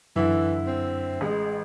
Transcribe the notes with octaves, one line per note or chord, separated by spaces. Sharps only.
F#2 D3 E3 E4
C4
A1 G#3